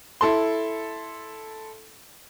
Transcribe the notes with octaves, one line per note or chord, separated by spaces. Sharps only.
E4 A4 C6